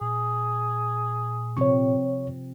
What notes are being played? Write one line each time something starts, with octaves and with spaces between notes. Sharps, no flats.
A#2 G#4
C3 F3 C4 C#5 C#6